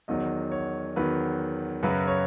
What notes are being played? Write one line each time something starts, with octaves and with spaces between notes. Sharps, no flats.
E2 D#3 F#3 D#5
C#5
E2 D#3 F#3 B4
F#2 C#3 F#3 B4
C#5